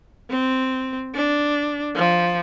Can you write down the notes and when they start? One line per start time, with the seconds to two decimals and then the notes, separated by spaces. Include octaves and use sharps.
0.30 C4
1.15 D4
1.96 F3